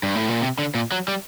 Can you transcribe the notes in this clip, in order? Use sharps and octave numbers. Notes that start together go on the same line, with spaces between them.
G2
A2
A#2
C3
D3
A#2
F#3
G3